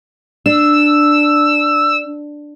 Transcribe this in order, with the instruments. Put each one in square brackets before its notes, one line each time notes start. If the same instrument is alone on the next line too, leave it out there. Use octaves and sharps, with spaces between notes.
[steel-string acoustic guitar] D4 [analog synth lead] E6